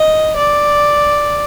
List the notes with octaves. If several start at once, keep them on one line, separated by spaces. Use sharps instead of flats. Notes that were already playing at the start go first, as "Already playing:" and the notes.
Already playing: D#5
D5